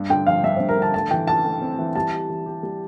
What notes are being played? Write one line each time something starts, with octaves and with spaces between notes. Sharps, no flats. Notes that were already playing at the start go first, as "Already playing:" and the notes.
Already playing: G2
D3 G5
F3 F5
G2 E5
G2 C5
A#4
D3 A5
A3 A5
E3 G5
A3 A5
A3
C4
E3
G3 A5
G4
E3
G4
G3